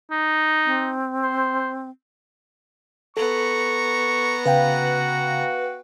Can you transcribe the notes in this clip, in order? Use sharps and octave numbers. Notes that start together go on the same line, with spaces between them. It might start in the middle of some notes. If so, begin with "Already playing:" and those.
D#4
C4
C5
B3 A4 A#5 C#6
C#3 F#4 B4 F5 G5